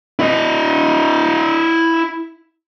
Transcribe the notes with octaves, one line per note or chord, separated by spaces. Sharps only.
E4 D#5